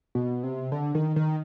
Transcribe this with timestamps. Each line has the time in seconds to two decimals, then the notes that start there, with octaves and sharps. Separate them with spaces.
0.15 B2
0.43 C3
0.72 D3
0.95 D#3
1.16 D#3